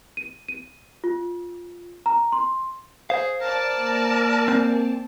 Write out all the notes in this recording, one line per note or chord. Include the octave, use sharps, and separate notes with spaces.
D#7
D#7
F4
A#5
C6
G#4 C5 F5
A#4 D5 A5
A#3
C4